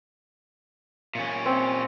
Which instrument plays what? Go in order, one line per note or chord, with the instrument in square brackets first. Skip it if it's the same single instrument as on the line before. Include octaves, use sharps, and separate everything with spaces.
[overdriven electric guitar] A#2 C#4
[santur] C4